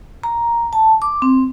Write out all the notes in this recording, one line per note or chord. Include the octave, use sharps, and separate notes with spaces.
A#5
A5
D6
C4